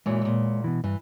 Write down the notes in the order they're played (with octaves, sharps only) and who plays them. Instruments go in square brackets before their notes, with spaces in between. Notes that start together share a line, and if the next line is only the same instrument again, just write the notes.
[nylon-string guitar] F#2 A#2 E3 [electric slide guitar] G#3 C#5
[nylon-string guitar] E2 A#2
[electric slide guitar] B2 E3
[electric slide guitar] G2 [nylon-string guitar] E3